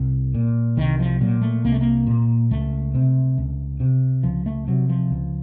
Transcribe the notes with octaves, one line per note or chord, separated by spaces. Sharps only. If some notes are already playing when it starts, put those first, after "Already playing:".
Already playing: C2
A#2
C2 D#3
F3
A#2 F#3
A3
C2 A#3
A3
A#3
A#2
C#2 A3
C3
C#2
C3
C#2 F3
A3
C3 F#3
F3
C#2